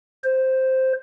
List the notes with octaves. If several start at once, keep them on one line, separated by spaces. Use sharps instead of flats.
C5